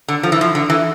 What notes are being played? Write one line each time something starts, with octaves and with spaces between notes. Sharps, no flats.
D3
F3
E3
F3
D3
E3